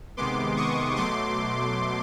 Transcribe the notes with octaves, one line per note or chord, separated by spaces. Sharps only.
C3 D#3 G#3 B3 C6 D6
C#6 D#6
B2 F#3 A3 C6 D6